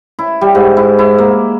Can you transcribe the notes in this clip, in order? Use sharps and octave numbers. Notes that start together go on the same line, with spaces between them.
E4
G3
G#2
E4
E4
A#3